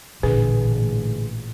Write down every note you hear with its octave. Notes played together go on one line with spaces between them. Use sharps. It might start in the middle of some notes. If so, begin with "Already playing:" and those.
A1 A#2 D3 G#4 B4